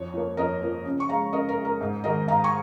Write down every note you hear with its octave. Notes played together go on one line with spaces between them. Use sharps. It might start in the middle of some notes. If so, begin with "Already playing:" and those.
Already playing: F2 C#5
F3 A#3
F2 A#4 D#5
F3 A#3
C#3
C#6
G#3 F5 A#5
C#3 A#4 D#5
A#4
G#3
A#4
G#2
D#3 G#3 A#4 D#5
G#2 F5 A#5
G#5 C#6